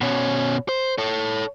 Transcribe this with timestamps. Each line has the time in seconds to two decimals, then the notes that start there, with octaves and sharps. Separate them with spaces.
0.01 B2 C#4
0.69 C5
0.98 A4 C#5